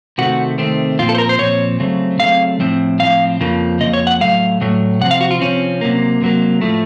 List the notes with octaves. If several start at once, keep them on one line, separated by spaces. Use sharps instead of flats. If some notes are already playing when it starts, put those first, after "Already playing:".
C3 D#3 A3 C4 F#4
C3 D#3 A3 C4
A#2 F3 C4 F4
A4
C5
A#4
C5
A#2 F3 C4 C#5
C#3 F#3 A3 C4
C#3 F#3 A3 C4 F5
A2 F3 C4
A2 F3 C4 F5
F2 C#3 F3 A#3
F2 C#3 F3 A#3 D#5
C#5
F#5
A2 F#3 A3 F5
A2 F#3 A3
C3 F3 C4 F#5
F5
F#4
F4
C3 F3 C4 C#4
C3 F#3 A#3
C3 F#3 A#3
A2 F3 A3